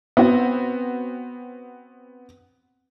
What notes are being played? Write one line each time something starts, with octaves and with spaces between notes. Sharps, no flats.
B3 C4 F#4